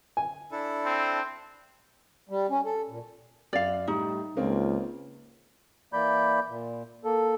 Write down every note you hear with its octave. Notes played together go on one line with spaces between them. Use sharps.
G#5
D4 E4 A4
C4
G3
C#4
A4
A#2
F#2 D5 F5
A2 G3 D#4
C#2 A#3 C4 F4
E3 A#3 D5 B5 G6
A#2
A#3 A4